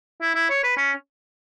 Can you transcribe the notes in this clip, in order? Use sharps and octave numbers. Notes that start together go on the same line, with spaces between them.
E4
E4
C#5
B4
C#4